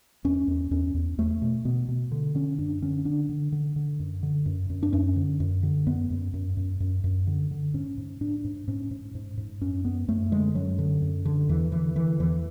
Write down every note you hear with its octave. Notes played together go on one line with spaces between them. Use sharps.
E2 C#4
E2
E2 C#4
E2
E2 A3
B2
B2 B3
B2
D3
D3 C#4
F#2 D4
D3 C#4
D3 D4
D3
D3
D3
F#2
D3
F#2
F#2
D4
F#2 C#4
D3
F#2
D3
F#2 B3
F#2
F#2
F#2
F#2
F#2
D3
D3
G#2 C#4
G#2
G#2 D4
G#2
G#2 C#4
G#2
G#2
G#2
F#2 C#4
F#2 B3
F#2 A3
D3 G#3
F#2 F#3
D3
F#2
D3
E2 E3
D3 E3
D3 E3
E2 E3